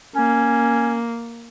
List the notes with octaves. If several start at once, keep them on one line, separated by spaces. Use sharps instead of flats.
A#3 C#4